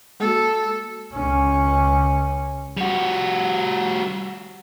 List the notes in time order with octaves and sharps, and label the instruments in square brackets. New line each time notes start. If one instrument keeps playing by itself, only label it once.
[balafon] G#3 A#3 F#4 [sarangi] A4
[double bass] C#2 C#4
[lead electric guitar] G3 F#4